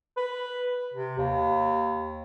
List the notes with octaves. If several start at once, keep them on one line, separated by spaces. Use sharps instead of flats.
B4
C3
D#2